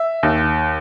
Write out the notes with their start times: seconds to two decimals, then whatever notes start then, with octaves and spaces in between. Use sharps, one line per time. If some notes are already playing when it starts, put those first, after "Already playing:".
Already playing: E5
0.23 D#2